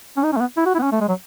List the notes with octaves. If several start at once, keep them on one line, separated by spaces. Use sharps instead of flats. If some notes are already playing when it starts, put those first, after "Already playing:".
C#4
D#4
C#4
A3
B3
E4
F#4
E4
B3
C#4
A3
G#3
F#3